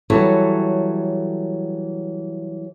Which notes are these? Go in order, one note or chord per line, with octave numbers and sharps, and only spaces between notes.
E3 F#3 G3 A4 C#5